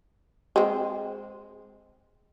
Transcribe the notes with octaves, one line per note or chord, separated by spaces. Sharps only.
G#3 C4